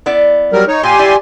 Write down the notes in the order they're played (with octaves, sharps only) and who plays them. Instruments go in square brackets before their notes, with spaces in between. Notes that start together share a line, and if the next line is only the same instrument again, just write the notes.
[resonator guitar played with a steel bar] B3 E4 D5
[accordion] F#3 G3 A#4
D#4 C#5
[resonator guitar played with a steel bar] A#2 [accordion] G4 G#5 C6
[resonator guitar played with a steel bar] E4 D5